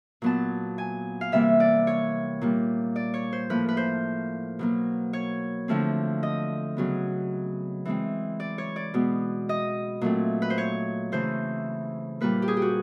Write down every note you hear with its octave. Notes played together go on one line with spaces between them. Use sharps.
A#2 F#3 B3 A5
G#5
F5
C3 E3 G3 A#3 E5
D5
C#5
A#2 G3 A#3
D5
C#5
C5
A2 F3 A#3 B4
B4
C5
B2 F#3 A#3
C#5
D3 F3 A3 C4
D#5
C#3 F#3 B3
E3 G#3 C4
D5
C#5
D5
B2 G#3 B3
D#5
A#2 F#3 A3 C4
B4
C5
C#5
C#3 E3 A3 C5
A#2 G3 A#3 B4
G4
G#4
G4
F#4